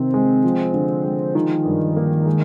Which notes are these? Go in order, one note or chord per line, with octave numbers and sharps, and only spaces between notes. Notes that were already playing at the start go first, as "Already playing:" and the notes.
Already playing: C3 D#3 C4
G#3
F3
D3
G#3
D#3 F3
G2
A#3
G#3